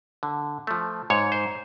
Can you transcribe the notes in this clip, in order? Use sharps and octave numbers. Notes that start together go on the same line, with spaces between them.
D3
F3 A3
G#2 C#5
C5